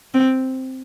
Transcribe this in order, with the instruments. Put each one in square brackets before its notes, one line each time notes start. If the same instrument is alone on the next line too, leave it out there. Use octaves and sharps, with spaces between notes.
[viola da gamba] C4